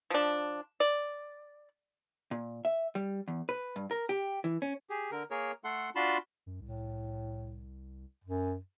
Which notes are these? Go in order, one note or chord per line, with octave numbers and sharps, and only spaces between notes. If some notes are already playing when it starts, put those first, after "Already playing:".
F3 D4
D5
A#2
E5
G3
E2
B4
G2
A#4
G4
E3
C#4
G4 G#4
D3 A#4
A#3 G#4 A#4 C#5
A3 A4 F#5 C6
D4 F4 F#4 A5 B5 C6
F#2
C2 A2
F#2